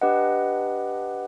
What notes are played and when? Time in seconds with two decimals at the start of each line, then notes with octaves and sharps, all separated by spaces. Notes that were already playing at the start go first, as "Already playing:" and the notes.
0.01 D4 G4 B4 D#5 F#5